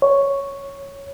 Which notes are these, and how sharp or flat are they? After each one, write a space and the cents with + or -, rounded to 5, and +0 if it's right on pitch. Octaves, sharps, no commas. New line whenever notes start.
C#5 +0